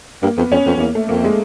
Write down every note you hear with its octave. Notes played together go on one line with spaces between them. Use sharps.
G2 A#3
F2 B3
F2 C#4
F2 B3
F2
E2 A#3
A3
F2 A#3
G#3